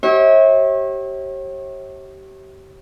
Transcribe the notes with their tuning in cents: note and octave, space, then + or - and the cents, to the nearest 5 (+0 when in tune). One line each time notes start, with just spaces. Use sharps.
G4 -30 C#5 -40 E5 -35